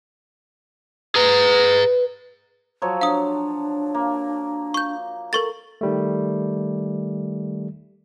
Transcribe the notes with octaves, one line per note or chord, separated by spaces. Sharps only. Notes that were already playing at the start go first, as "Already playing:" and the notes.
G#4 B4 A#5
F3 F#3 C#5
D4 F5 D#6
A#3
C#6 G6
A4 A#4 C#6 A6
D#3 G3 A3